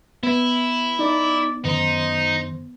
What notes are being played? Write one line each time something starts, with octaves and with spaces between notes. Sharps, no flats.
B3 E4
D#4 D5
F#2 D#3 D#4 C5